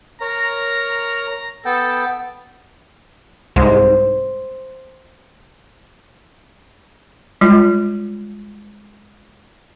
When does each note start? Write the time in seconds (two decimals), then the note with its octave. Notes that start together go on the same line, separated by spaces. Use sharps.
0.21 A#4 C#5 A#5
1.65 B3 A4 G5
3.56 C2 G#2 C5
7.41 G3 G#3 F4